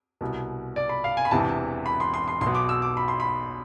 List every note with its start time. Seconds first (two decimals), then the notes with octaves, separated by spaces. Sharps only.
0.21 C2 B2
0.76 D5
0.89 B5
1.04 F5
1.17 G#5
1.25 B5
1.31 E1 E2 C3 E3 A5
1.86 B5
2.00 C6
2.14 C6
2.28 C6
2.41 B1 C6
2.46 B2
2.55 D6
2.69 E6
2.82 D6
2.97 B5
3.08 C6
3.20 B5